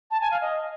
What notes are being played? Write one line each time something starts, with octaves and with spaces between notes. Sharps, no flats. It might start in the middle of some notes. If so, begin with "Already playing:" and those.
A5
G#5
F5
D#5